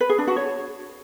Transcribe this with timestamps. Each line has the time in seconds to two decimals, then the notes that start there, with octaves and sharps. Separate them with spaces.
0.01 B4
0.09 G#4
0.18 D4
0.27 F#4
0.36 C#5